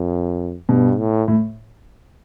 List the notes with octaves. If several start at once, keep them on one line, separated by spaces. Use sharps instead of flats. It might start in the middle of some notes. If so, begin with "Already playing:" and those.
Already playing: F2
G2 B2
A2
A2